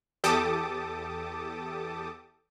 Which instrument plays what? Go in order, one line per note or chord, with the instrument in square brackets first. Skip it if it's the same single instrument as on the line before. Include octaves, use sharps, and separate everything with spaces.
[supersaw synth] E2 G4 A4 A5 D6 D#6